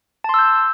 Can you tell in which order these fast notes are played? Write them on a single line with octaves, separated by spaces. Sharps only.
A5 C6 E6 G6